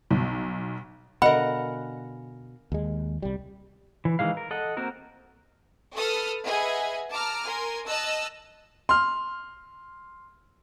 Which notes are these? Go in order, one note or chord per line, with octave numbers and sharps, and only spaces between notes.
B1
B2 D3 A#4 D#5 F5 F#5 G#5 B5
D#2 G#3
C2 G3
E3
D#3 E3 G#3 F5
A#4
A4 D#5 F#5
A#3 C4 F#4 A#4
A4 B4 D#6 F6
G#4 B4 D#5 E5 F#5 G#5
A5 A#5 D6 F6
A#4 G#5 A#5 C6
D#5 A5 E6 F#6
C6 F6